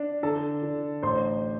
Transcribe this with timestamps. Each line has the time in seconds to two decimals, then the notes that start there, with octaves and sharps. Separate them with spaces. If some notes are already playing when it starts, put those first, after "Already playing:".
Already playing: D4
0.23 D3 A4 A5
0.63 D3
1.03 A1 C5 C6